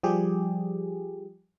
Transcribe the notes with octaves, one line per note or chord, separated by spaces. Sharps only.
F3 G3 G4 G#4